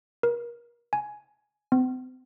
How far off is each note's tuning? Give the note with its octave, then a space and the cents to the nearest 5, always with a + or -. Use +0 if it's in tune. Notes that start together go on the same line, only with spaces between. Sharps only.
A#4 +30
G#5 +15
C4 -45